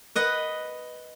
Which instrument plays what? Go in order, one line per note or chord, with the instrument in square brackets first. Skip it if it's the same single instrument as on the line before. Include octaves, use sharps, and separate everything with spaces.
[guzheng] B4 D#5 F#5